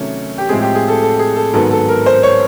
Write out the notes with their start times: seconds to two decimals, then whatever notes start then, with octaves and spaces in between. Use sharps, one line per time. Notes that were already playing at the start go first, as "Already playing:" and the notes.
Already playing: C3 D#3 F#3 A3 C#4
0.38 G4
0.49 A2 F3 G#3 C4 G#4
0.62 G4
0.75 G#4
0.88 A4
1.01 A4
1.19 G#4
1.36 A4
1.53 G#2 D#3 F#3 B3 A4
1.71 A4
1.88 A#4
2.06 C5
2.23 C#5